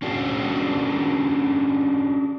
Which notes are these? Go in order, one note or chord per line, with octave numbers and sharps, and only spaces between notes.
C#4 D4 F#4 G#4 C#5 D5